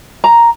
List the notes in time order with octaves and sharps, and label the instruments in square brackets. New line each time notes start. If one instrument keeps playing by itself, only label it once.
[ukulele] A#5